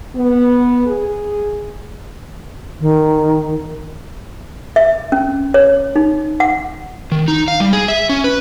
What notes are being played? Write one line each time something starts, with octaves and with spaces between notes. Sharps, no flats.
B3
G#4
D#3
E5
C#4
C#5
D#4
F#5
D#3
D#4
F5
G3
G#4
E5
C#4
B4